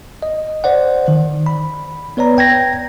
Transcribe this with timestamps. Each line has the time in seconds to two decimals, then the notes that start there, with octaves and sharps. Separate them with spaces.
0.23 D#5
0.64 C5 D5 F#5
1.08 D#3
1.46 B5
2.17 B3 B4 C#5 D5 A#5
2.38 G5 G#6 A#6